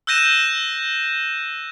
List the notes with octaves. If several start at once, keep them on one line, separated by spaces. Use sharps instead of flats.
E6 F#6 G6 A#6 D#7 E7